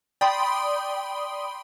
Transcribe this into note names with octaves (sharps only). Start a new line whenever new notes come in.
D5 G5 B5 C6 D#6